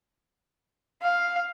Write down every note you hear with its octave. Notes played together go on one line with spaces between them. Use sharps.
F5